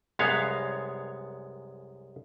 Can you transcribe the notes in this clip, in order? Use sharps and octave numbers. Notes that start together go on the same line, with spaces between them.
C2 F#2 G#3 B3 C#5 F5